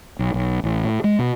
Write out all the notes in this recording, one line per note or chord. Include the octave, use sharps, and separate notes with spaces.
B1
B1
A1
A2
G#3
B2